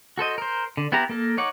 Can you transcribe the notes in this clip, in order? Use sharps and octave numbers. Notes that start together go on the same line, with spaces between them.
F#4 A4 C5 D#5
A#4 C5
D3
B3 E4 G4 A#5
A#3 A4 A#4
D#4 C#5 F#5 D6